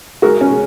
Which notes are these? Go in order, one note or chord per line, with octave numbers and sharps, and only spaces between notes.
G#3 F#4 A#4
C#4
G#3